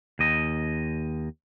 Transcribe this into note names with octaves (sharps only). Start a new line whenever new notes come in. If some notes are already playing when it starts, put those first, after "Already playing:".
D#2 D#5